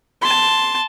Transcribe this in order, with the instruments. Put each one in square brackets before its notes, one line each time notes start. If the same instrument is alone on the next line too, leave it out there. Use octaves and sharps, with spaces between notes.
[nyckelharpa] A5 C6